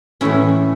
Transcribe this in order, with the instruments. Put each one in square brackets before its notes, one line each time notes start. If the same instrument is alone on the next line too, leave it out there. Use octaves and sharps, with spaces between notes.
[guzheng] A2 E3 A3 C#4 E4